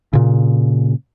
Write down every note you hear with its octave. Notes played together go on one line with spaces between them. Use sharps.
A#2 C#3